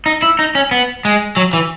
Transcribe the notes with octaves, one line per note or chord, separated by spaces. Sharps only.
D#4
E4
D#4
C#4
B3
G#3
F#3
E3